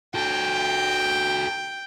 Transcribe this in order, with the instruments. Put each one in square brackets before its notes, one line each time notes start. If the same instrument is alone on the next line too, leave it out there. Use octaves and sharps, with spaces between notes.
[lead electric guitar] F#4 A4 [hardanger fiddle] G5